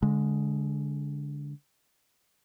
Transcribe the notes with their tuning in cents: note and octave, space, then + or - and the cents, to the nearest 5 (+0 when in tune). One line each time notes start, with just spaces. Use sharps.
D3 -25 G#3 +0